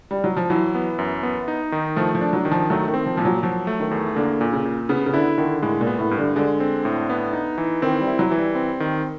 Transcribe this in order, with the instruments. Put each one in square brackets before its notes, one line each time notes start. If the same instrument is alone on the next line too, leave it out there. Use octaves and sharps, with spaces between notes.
[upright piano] G3
F#3
F3
[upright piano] E3 [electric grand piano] F#3
[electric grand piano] B3
F#2
B3
D#4
D#3
[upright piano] F3 [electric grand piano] A3
[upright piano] F3
[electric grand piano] D4
[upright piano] F#3
[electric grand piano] D#3
[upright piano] F3
[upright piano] F#3 [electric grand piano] A3
[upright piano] D#3
[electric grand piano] C4
[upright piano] F3
[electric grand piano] A#2 [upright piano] F3
[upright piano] F#3
[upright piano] F3 [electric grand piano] F#3
[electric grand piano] A3
[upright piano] D#3
[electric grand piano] E2
[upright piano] D3 [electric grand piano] A#3
[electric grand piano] A#2
[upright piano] C#3
[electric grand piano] A#2
[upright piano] C#3 [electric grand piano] B3
[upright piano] C#3
[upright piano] D3 [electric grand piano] E4
[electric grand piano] D3 [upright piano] D#3
[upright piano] A2 [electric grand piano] G#3
[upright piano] A#2
[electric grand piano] B3
[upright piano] A2
[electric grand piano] G2
[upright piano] D3
[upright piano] D3 [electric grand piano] G#3
[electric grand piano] C4
A2
B3
D#4
E3
[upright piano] D#3 [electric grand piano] C4
[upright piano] G3
[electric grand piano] E4
[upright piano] F#3
[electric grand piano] E3
[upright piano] G3
[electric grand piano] C4
D#3